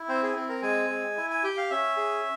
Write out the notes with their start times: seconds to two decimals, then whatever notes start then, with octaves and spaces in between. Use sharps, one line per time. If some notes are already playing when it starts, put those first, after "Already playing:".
Already playing: E4
0.09 C4 C5
0.23 G#4
0.36 C4
0.49 A#4
0.63 G#3 G#5
0.90 G#3
1.17 E4
1.30 G#5
1.44 G4 G5
1.57 F5
1.70 C#4 E5
1.97 G#4